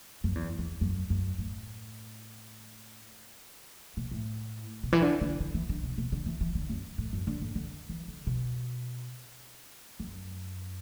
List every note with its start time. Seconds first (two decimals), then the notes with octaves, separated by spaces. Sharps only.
0.24 F#2
0.35 E2
0.59 E2
0.81 F#2
1.10 F#2
1.38 A2
3.97 B2
4.11 A2
4.83 B2
4.93 E3
5.02 D3
5.21 D3
5.40 D3
5.54 E3
5.69 D3
5.83 B2
5.98 B2
6.12 D3
6.26 E3
6.41 E3
6.55 D3
6.69 F#2
6.98 A2
7.13 F#2
7.27 D3
7.41 A2
7.55 D3
7.89 E3
8.08 D3
8.27 B2
10.00 F#2